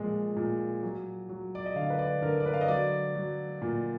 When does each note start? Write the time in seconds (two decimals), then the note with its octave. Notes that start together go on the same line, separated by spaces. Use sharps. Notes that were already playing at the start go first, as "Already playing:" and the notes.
Already playing: A#2 F3 G#3
0.36 A#2
0.83 F#3
1.29 F#3
1.55 D5
1.66 D#5
1.76 D3 F5
1.90 B4
1.99 D5
2.22 D3 A#4
2.40 D5
2.46 B4
2.54 F5
2.61 D#5
2.68 F#3 D5
3.15 F#3
3.62 A#2